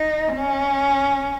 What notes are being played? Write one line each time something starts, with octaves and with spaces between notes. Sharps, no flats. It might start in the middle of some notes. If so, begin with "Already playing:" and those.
Already playing: D#4
C#4